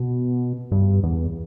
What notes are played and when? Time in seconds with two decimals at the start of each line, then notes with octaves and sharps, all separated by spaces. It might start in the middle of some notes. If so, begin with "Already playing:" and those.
Already playing: B2
0.71 G2
1.03 E2